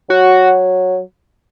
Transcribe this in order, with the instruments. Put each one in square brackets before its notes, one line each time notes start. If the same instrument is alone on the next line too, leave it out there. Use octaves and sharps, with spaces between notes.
[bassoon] F#3 [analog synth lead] F#4